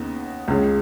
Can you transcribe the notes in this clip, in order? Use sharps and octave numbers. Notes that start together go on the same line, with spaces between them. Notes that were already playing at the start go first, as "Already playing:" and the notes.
Already playing: D#2 C#3 B3 D#4
C#2 C#3 G#3